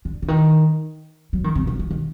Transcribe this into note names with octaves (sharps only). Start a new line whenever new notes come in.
D3
D3
D#3
F#3
D#3
C3
D3
D#3
D#3